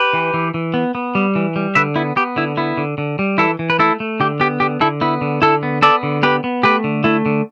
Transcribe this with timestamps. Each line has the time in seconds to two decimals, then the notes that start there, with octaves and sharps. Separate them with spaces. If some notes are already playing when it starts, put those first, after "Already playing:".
Already playing: G4 B4
0.13 E3
0.34 E3
0.54 E3
0.74 B3
0.95 B3
1.15 G3
1.36 E3
1.56 G3
1.75 D3 B4 E5
1.96 B3 E4
2.16 B3 G4
2.36 D3 E4
2.57 B3 E4
2.77 D3
2.98 D3
3.19 G3
3.38 E3 E4 A4
3.59 E3
3.70 B4
3.79 A3 E4 A4
4.00 A3
4.20 D3 G4
4.40 B3 G4
4.60 D3 G4
4.80 D3 E4 A4
5.01 B3 E4
5.21 D3
5.42 D3 E4 A4
5.63 B3
5.82 B3 A4 D5
6.03 D3
6.23 B3 G4 B4
6.44 B3
6.63 A3 G4 B4
6.84 D3
7.04 A3 E4
7.26 D3